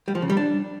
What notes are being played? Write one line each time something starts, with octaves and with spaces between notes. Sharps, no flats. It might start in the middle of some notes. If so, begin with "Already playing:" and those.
G3
F3
C#3
G3
D4